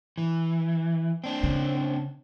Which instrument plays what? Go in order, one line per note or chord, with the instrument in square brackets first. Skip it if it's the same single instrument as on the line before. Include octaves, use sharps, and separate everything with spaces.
[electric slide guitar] E3
C4 D4
[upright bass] C#3